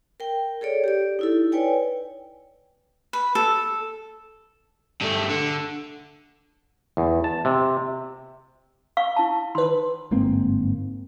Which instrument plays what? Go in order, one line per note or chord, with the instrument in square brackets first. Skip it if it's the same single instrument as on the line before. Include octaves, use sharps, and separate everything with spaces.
[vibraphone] A#4 G5
G#4 A4 C#5 D5
G4 D5
D#4 E4 A4
B4 C#5 D5 G5 G#5
[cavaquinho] B4
A4
[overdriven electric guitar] G2 A3
D3
[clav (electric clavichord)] E2
A5
C3
[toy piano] F5 C#6
E4 A5
[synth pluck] D#3 B4 [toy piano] C6
[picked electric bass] G1 G#2 A#3 C4